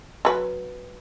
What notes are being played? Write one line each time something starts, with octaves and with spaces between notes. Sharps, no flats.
F#3 B4